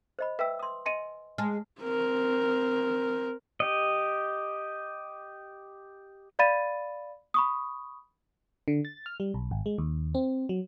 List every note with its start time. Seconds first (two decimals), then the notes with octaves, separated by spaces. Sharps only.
0.19 C5 D#5 B5
0.39 B4 E5 G5 E6 B6
0.59 C6 D#6
0.86 D#5 G#5 C6 A#6 C#7 D#7
1.38 G#3 A5 F6
1.81 C4 A#4
3.60 G4 D#5
6.39 D5 F5 B5 A6 D#7
7.34 B5 C#6 D#6
8.68 D3
8.85 A6
9.06 F6
9.20 G3
9.34 B1
9.51 G#1
9.66 G#3
9.78 D#2
10.15 C4
10.49 F#3